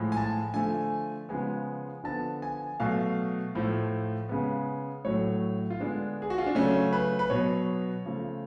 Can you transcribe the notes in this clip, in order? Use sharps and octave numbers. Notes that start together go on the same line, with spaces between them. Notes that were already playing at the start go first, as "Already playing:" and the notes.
Already playing: A2 F3 G#3
G#5
A5
D3 F3 A3 G#5
C#3 F3 G#3 B3 G#5
D3 F3 B3 A5
G#5
B2 F#3 A3 F5
A2 F3 A3
C#3 G#3 B3
A2 F#3 A3 C#5
F4
D3 G#3 B3 D4
G#4
F#4
F4
D4
C#3 F#3 A3 C#4
B4
B4
B2 F#3 B3 C#5
C#3 F3 A3